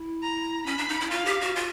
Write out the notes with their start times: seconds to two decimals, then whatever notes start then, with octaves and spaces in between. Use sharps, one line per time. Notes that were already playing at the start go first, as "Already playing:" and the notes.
Already playing: E4
0.22 A#5
0.66 C#4 B5
0.78 D4
0.89 D#4
1.00 E4
1.11 F4 F5
1.25 G4
1.41 F#4
1.55 F4